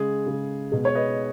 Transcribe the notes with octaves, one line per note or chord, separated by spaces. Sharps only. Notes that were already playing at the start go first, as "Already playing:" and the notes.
Already playing: C#3 G#3 G#4
C#3 G#3
B2 G#3
C#5
B4 D#5